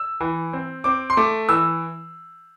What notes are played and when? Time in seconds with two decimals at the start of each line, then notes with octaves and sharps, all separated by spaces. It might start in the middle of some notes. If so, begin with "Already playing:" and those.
Already playing: E6
0.21 E3
0.53 C4
0.84 C4 D6
1.10 C6
1.17 A3 D6
1.49 E3 E6